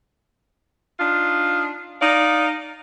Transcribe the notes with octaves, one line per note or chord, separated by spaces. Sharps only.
D4 D#4 F4
D#4 D5 F5